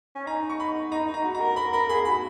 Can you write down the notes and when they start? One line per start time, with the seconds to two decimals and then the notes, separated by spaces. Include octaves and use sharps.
0.15 C#4
0.27 D#4 A#5
0.50 C#6
0.60 B5
0.92 D#4 A#5
1.08 D#4
1.14 A#5
1.24 F#4
1.34 A#5
1.41 A#4
1.56 A#4 B5
1.73 A#4 B5
1.89 G#4 B5
2.05 F#4 B5